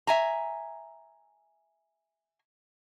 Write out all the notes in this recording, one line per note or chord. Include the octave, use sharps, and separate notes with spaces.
E5 G#5 A#5